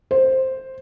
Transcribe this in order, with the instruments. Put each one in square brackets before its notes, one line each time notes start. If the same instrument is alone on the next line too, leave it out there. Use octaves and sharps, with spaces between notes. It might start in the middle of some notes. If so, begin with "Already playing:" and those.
[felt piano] C5